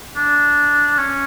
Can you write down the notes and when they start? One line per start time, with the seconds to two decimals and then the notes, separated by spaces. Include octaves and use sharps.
0.16 D4
0.98 C#4